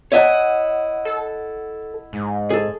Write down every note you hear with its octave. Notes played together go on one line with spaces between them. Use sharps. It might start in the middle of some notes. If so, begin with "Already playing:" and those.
E4 C#5 D#5 E5 F#5 A5
A4
G#2
G#4 A4